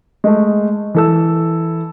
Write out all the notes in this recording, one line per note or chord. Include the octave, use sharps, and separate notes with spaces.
G#3 A3
E3 A4 E6